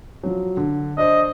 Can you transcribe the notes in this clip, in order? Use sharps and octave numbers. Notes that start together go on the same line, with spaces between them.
F3 F#3
D3
D4 C5 D#5